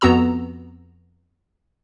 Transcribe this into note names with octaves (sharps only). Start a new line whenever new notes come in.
F2 B3 F#4 A#5 E6